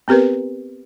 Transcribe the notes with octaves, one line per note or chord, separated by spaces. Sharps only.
B3 C4 G4 A#4 B4